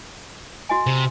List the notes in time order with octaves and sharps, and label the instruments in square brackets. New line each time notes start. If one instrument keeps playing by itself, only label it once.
[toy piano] F#4 D#5 G#5
[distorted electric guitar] C3